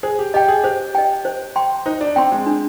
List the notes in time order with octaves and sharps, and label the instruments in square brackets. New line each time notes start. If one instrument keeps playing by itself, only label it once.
[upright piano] G#4 [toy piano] C5
[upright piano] G4
[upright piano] G4 [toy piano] D#5 G5
[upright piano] G#4
[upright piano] G4 [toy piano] C5
[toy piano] D#5 G5
C5
G5 C6
[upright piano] D#4 [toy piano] C5
[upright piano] D4
[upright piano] C4 [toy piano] G5 C6
[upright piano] G#3
[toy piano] D4